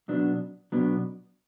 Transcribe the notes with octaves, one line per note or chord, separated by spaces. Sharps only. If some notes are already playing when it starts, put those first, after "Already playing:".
B2 F#3 B3 D4
B2 F#3 B3 D4